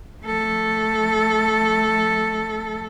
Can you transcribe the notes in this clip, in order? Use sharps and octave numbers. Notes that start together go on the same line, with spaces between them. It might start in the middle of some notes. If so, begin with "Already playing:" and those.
A3 A4